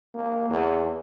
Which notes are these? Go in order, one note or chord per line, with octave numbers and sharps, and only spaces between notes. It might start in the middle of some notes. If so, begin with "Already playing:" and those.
A#3
E2